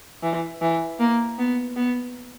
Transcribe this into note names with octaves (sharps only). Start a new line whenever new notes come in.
E3
E3
A#3
B3
B3